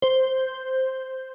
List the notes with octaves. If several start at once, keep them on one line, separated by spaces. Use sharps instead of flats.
C5